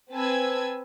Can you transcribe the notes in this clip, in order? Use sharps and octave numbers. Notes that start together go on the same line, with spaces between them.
C4 B4 G#5 A5 E6 G#6